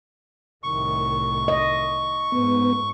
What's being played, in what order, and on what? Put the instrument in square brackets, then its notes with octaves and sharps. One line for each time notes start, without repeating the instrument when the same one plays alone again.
[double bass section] C2 A2 D#3 [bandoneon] C#6
[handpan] D#5
[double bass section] G#2 [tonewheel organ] B3